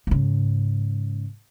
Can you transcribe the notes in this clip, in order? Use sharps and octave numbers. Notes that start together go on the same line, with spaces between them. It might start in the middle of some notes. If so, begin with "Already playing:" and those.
G#2 C#3